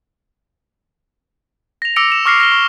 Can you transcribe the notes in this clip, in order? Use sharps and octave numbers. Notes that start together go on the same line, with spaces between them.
A#6 F7
D6 E6 A#6 C#7 D7 F7
E7
C#6 D6 F6 A#6 C7 C#7
F6 A#6 F7 G7
C#6